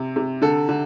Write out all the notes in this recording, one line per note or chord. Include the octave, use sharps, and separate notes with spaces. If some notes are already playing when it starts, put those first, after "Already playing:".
Already playing: C3
C3
D3 A4
D3